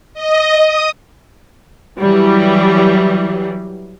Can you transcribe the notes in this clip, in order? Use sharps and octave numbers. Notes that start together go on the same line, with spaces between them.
D#5
D#6
E3 F#3 G3